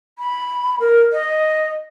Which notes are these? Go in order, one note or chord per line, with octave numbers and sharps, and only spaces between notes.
B5
A#4
D#5